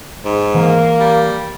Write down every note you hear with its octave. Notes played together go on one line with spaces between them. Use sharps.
G#2
E3 A#3
G3